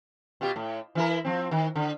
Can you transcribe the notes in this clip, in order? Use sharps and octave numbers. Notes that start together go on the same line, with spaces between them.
B2 F4 G4
A2
E3 E4 A#4
F3 C4
D#3
D3